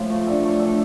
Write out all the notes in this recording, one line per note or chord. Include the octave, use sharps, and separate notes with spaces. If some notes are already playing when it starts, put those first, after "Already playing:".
Already playing: A2 F3
A3
D4 A4
A3
D4 A4